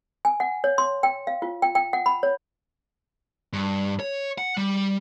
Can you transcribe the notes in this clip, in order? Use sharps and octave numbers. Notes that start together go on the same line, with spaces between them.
G#5
F#5
C#5
C6
G5
F5
F4
G5
G5
F#5
B5
C#5
G2
C#5
F#5
G3